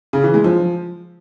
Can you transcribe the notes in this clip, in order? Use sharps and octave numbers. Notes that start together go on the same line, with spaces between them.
C#3
E3
G#3
F3